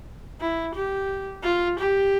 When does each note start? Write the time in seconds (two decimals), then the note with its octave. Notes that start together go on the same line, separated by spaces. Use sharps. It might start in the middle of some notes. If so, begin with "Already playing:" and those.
0.41 E4
0.75 G4
1.44 F4
1.79 G4